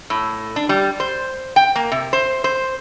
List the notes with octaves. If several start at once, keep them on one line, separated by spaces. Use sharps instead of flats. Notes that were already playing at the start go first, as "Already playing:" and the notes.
A2
D4
G3
C5
G5
A#3
C3
C5
C5